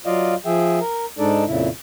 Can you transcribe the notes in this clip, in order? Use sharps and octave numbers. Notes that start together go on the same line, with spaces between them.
F#3 F4 D5 D#5 F5
F3 G#4 E5 G5
A#4
G#2 G#3 D4 D#4 A4 D5
F2 A#2 C#3 E4